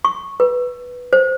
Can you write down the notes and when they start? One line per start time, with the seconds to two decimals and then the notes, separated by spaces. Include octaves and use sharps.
0.05 C#6
0.40 B4
1.13 C5